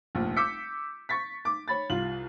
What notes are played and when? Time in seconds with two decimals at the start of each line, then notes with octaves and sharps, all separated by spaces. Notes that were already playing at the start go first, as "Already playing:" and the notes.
0.15 F1 A#1
0.36 D6 E6 G6 B6 C#7
1.09 C#6 A6 B6
1.45 D6
1.68 C#5 B5 A6
1.90 C2 F4 F#7